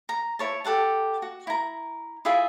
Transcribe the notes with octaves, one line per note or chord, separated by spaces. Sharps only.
A#5
E4 C#5 A5
G4 A4 F#5 A5
F#4
E4 A#5
E4 F4 G#4 E5